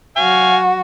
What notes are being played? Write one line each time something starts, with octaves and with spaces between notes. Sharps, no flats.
F#3 F#4 F5 G#5